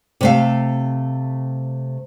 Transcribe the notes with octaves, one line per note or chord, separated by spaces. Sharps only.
C3 A3 F5